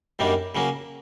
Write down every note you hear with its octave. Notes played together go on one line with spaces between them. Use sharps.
F#2 D#3 G3 A#3 D4
C#3 F#3 A#3 C#4